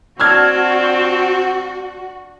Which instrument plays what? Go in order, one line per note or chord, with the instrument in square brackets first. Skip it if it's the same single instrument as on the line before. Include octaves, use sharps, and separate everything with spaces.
[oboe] C4 [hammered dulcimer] D4 [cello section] F#4 [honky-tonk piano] E6 F6 G#6